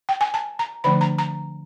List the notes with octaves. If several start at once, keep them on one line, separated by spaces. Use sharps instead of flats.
G5
G#5
A5
A#5
D3 F3 A3 D4 B5
A#5
A#5